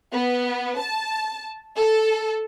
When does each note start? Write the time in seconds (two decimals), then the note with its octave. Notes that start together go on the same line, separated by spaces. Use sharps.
0.12 B3
0.80 A5
1.77 A4